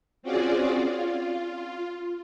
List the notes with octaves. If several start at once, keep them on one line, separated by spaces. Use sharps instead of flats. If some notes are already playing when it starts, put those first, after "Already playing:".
C4 C#4 F4 F#4 G#4 D5
F4